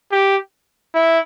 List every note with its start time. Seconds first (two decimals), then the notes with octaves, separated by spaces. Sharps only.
0.12 G4
0.94 E4